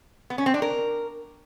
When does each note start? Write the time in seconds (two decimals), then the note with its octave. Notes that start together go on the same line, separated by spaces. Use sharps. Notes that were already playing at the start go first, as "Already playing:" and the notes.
0.30 B3
0.38 C#4
0.46 C4
0.54 D4
0.62 A#4